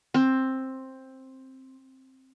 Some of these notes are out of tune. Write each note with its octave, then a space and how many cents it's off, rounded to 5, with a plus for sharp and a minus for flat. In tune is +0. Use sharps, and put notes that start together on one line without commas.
C4 +10